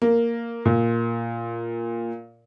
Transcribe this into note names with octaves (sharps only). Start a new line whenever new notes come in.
A#3
A#2